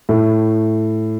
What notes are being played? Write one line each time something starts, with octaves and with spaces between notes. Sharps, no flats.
A2